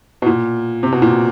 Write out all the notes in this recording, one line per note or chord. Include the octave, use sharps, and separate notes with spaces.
B2
A#2
C3
B2
A#2